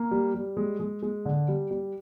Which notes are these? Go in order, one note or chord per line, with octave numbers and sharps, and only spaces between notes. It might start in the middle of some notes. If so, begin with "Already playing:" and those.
Already playing: A#3
G3
G3
G#3
G#3
G#3
D3
G3
G3